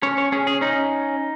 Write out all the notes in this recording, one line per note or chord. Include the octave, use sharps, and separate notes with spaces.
C#4 C#5
C#5
C#4 G#4
G#4
C#4 D#4